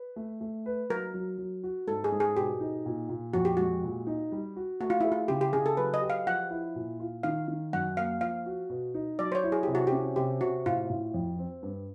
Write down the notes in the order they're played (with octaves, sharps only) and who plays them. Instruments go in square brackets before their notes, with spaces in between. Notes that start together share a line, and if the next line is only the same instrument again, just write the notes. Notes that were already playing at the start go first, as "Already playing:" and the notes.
Already playing: [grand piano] B4
A3
A3
B4
[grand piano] F#3 [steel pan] A#4
[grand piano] F#3
F#3
F#4
[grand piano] G#2 [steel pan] A4
[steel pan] G#4
[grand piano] G#2
[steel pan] G#4
[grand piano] B2 [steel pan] G4
[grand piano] D#4
A#2
A#2
[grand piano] F2 [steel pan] F#4
[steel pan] G4
[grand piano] G#3 [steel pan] F#4
[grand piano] A#2
D#4
G3
F#4
[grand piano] A3 [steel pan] F#4
[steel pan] F4
[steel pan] E4 [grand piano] G#4
[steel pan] F4
[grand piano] C#3 [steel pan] G4
[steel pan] G4
[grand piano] C#3 [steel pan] G#4
[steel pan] A4
[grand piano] F#3 [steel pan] B4
[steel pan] D#5
[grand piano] G4
[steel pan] F5
[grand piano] F3 [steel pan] F#5
[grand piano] E4
A#2
F4
[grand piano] D#3 [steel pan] F5
[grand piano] D#3
[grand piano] F#2 [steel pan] F#5
[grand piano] A#3 [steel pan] F5
[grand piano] F3 [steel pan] F5
[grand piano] F#4
B2
D#4
[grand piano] F#3 [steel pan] D5
[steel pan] C5
C#5
[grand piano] E4
[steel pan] G#4
[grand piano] C3 [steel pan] G4
[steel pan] F#4
G4
[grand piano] C#4
[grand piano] C3 [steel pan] G4
[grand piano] C3 [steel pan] F#4
[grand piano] A2 [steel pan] F4
[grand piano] A2
F2
C4
G2